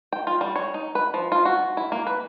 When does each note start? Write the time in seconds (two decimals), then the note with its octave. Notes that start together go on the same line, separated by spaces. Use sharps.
0.12 G5
0.27 F4
0.41 G3
0.56 C#5
0.74 D#4
0.95 B4
1.14 F3
1.32 F4
1.45 F#4
1.77 E4
1.92 A#3
2.07 B4